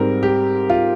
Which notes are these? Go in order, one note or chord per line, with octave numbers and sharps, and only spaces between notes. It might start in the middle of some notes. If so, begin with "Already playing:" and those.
Already playing: G#2 G3 C4 A#4
G4
F4